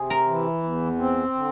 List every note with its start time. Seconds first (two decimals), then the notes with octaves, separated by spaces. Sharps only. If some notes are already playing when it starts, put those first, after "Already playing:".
Already playing: C3 G#4
0.10 A#4
0.27 E3
0.63 E2
0.99 C4
1.34 D3